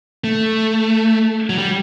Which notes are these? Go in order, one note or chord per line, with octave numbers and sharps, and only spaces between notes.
A3
F#3
G3